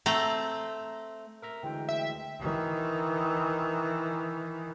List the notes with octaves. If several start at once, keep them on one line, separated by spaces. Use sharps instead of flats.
A3 C4 A#5
A#4 E5 A#5
D2 E3 G#3 G5
E5
D#3 E3